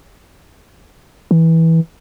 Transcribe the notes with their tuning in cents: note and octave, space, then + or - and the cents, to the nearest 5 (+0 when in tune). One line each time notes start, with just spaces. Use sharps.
E3 -15